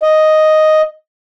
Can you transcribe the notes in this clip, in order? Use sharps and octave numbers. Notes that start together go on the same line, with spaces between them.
D#5